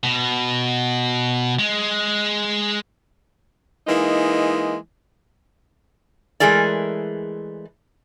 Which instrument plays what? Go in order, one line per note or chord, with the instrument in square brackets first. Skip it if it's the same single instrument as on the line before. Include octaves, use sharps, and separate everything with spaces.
[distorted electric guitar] B2
G#3
[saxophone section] E3 G#3 A#3 D#4
[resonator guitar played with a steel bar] E3 G#3 A3 G#4 A#4 D5